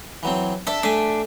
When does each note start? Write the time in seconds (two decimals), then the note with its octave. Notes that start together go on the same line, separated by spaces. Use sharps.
0.23 E3 F#3 C4
0.67 D4 A4 E5
0.83 A3 D4 E5 G#5